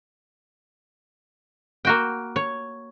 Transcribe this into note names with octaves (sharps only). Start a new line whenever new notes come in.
A#3 F#4 G5
C#5